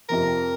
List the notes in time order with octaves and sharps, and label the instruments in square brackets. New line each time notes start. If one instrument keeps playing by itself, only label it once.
[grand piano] F2 C3 F3 [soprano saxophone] A#4